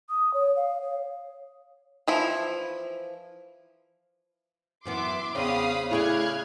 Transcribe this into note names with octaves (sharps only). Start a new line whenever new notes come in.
D#6
C#5
F5
C#5
E3 F3 E4
F#2 E3 B3 E5 C6 D6
E2 C#3 C4 D4 F5 B5 D#6
C#3 A3 E4 G#4 D5 F6 F#6 G#6